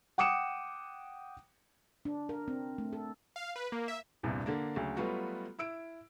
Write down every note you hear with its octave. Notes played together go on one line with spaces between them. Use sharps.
F#5 G5 D6 D#6 C#7 E7
D4
A#4
C4
A3
A4
F5
B4
A#3
E5
A#1 E2 G2 C3
D3 A#3 D4
D2 C#3 F#3
F#3 G3 A3 B3 F4 F#4
E4 E6 D7